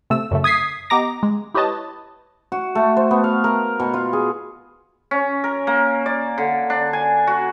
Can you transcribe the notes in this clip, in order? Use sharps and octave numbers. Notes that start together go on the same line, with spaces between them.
C3 A3 E6
F#2 C#3 A3
D#6 G#6 B6 C7
B3 G4 D#5 A#5 D6 A#6
G#3
E4 G4 B4 C#5 D#5 A5
F#4
A3
C5
B3
F5
A#4
B2
F4
G#4
C#4
A#4
A#3
D5
D3
D4
G#5
F#4